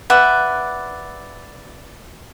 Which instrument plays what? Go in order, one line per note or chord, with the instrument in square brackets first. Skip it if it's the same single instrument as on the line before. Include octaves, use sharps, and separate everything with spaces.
[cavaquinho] B4 D5 E5 F#5